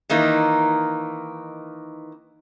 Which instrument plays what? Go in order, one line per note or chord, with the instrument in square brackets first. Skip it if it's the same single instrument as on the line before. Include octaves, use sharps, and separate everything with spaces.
[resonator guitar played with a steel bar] D#3 E3 A#3 D#4